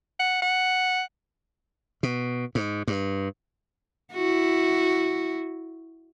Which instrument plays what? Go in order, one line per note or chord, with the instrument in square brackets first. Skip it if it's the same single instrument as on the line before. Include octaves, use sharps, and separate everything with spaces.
[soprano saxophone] F#5
F#5
[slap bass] B2
G#2
G2
[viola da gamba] E4 F#4